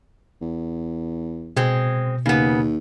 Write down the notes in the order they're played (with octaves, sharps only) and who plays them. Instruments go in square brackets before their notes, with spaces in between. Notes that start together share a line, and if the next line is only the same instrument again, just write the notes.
[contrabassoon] E2
[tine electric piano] B2 [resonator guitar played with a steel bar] G#3 C4
[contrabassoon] D#2 [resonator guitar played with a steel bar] C#3 B3